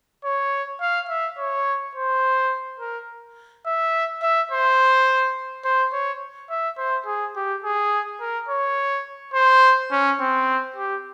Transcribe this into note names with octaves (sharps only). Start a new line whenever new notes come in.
C#5
F5
E5
C#5
C5
A#4
E5
E5
C5
C5
C#5
E5
C5
G#4
G4
G#4
A#4
C#5
C5
C#4
C4
G4